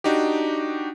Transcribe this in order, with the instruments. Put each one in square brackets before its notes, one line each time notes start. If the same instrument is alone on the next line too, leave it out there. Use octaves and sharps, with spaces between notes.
[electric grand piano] D4 D#4 F#4 G4